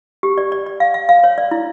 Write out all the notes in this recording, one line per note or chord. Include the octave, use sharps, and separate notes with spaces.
G4
D5
D5
D5
F5
F5
F5
C#5
D5
E4